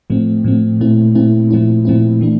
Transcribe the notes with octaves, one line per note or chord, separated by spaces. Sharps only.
A2 F3 A3 C4
A2 F3 A3 C4
A#2 A3 C4 E4
A#2 A3 C4 E4
A#2 F3 A3 C4 E4
A#2 F3 A3 C4 E4
E3 A3 D4